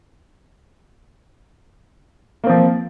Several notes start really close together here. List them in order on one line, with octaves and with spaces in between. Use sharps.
A#3 C4 F3